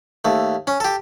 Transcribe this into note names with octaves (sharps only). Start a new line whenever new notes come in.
D#2 A3
C#4
G4 A4